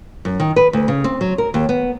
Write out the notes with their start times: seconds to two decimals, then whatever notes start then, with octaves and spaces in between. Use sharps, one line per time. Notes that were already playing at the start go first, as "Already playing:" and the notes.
0.25 F#2
0.40 D#3
0.56 B4
0.73 D2
0.88 C#3
1.04 C4
1.21 F#3
1.38 A#4
1.54 D#2
1.69 B3